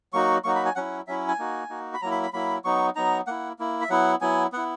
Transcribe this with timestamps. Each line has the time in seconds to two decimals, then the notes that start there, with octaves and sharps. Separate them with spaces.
0.13 F#3 A#3 D#4 F#4 C#6
0.44 F#3 A#3 D#4 F#4 C#6
0.55 B5
0.65 G#5
0.75 F#3 C#4 E4 F#5
1.07 F#3 C#4 E4 E5
1.28 G#5
1.39 A#3 D#4 F#4
1.70 A#3 D#4 F#4
1.94 B5
2.02 F#3 A#3 E4 A#5
2.11 B5
2.23 B5
2.33 F#3 A#3 E4 B5
2.64 F#3 B3 D#4 C#6
2.95 F#3 B3 D#4 A#5
3.27 A#3 E4 F#5
3.59 A#3 E4
3.81 E5
3.89 F#3 B3 E4 F#5
4.21 F#3 B3 E4 G#5
4.52 B3 E4 F#5